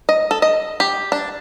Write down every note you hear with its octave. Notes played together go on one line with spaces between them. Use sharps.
D#5
A4
D#5
G4
D4